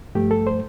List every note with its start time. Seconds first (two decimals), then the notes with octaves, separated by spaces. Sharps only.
0.15 G2 F3 A3 G4
0.31 A4
0.47 C5